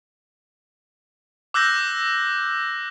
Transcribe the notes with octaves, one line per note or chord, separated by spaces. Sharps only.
D6 E6 F#6 G6 A#6